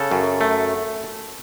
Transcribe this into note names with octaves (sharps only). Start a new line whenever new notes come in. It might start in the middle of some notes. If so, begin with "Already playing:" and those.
Already playing: C#3 A4
F#2
A3